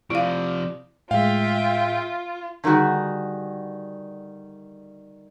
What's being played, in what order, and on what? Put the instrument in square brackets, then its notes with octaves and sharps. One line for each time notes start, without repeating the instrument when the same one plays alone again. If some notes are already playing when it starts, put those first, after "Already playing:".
[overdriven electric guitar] C3 F3 [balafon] E4 F5 [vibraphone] D5 D6 D#6
[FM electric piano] A2 G#3 [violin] F4 [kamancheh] E5 G5 [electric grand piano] F5
[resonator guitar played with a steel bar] D3 D#3 G3 F#4 G#4